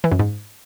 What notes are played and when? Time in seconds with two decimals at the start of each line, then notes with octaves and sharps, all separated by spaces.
0.04 E3
0.12 F#2
0.19 G#2